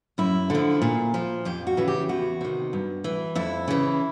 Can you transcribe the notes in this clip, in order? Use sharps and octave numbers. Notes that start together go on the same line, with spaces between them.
F#2 E4
D3 F3
A#2
F3
F2 G4
F#4
C#3 E3
G4
E2 F#4
C3 D#3
G2
E3
F2 E4
C#3 E3